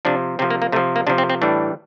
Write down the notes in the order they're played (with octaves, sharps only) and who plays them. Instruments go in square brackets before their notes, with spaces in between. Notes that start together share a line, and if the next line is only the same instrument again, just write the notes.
[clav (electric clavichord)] C3 F3 D4
C3 F3 C4
A#3
A#3
C3 A3
F3
A#3
C3 F3 D4
C4
C4
A2 E3 G3 D4